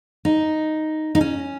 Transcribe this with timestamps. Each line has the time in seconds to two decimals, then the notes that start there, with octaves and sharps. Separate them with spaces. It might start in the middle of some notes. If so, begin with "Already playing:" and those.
0.25 D#4
1.15 D#4
1.21 C#4